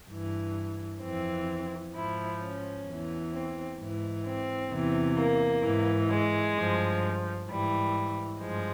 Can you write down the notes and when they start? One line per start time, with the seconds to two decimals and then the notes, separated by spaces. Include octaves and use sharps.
0.11 G2 E3
1.03 F2 E3 C4
1.95 G#2 F3 E4
2.42 C#4
2.88 E2 E3
3.33 C4
3.80 G#2 E3
4.25 C4
4.72 E2 C3 E3
5.18 A#3
5.64 G#2 E3
6.10 G#3
6.56 G2 F3
7.48 G#2 E3 G3
8.40 G2 F3 G#3